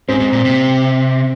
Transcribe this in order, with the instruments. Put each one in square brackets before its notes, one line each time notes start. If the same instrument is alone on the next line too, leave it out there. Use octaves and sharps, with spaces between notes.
[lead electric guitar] G#2 [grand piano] C4
[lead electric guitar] G#2
A#2
C3